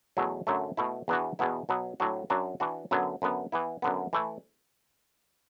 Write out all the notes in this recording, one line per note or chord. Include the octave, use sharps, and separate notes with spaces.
E2 B2 F#3 A3
F#2 D3 F#3 A3
B2 A3 E4
E2 E3 B3 D4 F#4
E2 B2 B3 E4
B2 F#3 B3
A2 F#3 D4 F#4
F#2 F#3 D4 F#4
E3 D4 F#4
F#2 D3 F#3 B3
F#2 D3 B3
E3 B3 E4
F#2 D3 B3
E3 A3 E4